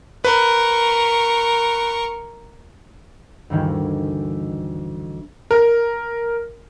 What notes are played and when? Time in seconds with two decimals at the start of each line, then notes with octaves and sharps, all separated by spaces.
0.24 A#4 B4 C#6
3.50 D2 G2 D#3 E3
5.51 A#4